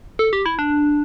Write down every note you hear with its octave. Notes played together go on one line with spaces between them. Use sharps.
A4
G4
E4
D4